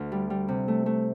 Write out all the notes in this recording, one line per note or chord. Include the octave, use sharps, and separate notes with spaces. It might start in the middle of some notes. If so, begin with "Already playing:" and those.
Already playing: D2
G3
G3
C3
A3
A3